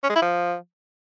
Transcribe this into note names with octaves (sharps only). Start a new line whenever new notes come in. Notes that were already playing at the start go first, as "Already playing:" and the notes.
C#4
G#3
E4
F3